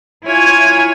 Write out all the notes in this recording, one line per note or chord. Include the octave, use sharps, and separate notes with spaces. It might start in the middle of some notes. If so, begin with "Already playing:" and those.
E4 F4 C#5 G#5